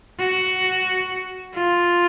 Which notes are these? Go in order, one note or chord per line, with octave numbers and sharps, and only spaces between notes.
F#4
F4